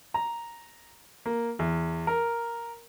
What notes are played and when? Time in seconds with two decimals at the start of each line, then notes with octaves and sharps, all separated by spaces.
0.14 A#5
1.26 A#3
1.59 E2
2.07 A#4